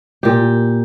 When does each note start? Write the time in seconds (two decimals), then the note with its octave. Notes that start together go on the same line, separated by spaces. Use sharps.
0.23 A#2 G4